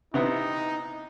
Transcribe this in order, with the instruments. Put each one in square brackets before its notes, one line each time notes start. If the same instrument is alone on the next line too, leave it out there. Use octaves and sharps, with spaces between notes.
[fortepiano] C3 B3 E4 [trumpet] D#4